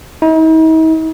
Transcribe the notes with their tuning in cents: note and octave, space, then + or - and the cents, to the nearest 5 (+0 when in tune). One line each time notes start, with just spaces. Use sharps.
D#4 +45